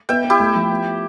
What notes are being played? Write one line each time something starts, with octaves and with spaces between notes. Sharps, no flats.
B3 E5 G5
B3
E4 G4
A3
F3
B3